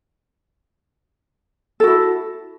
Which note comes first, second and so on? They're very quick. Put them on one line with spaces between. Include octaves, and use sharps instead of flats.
A4 F#4 E4